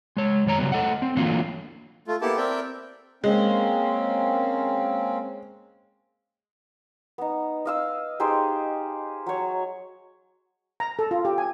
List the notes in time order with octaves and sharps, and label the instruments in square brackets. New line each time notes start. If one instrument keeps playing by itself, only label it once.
[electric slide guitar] G#3 C#5
F#2 D#3 C#5 A#5
C#3 F#3 G3 B3
A3 A4 D#5 F#5
C4
D3 E3 F#3 A3 A#3 F4
[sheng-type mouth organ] A3 F4
A#3 B3 E4 G4 A4 A5
C4 A#4 D5 E5 G5
[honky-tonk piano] G#3 [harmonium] A#3 C4 C#4
[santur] B3 D#4
D#5 F5 E6
D#4 G4 G#4 C5
F#3 C#5
[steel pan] A#5
A4
F4
G4
G#5